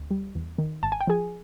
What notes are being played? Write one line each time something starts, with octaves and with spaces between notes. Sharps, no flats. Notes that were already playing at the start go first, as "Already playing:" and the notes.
Already playing: D2
G3
E2
D#3
G#1 A5
G#5
G5
F3 G#4 G#5